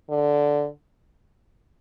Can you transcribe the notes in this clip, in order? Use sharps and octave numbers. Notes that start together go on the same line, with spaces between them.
D3